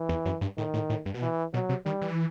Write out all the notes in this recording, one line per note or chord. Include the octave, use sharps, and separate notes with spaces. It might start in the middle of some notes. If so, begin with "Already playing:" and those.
Already playing: E3
E2
F#2
G2
A2 D#3
A2
A2
G2
B2
E3
B2 F#3
C3
D#3 G3
E3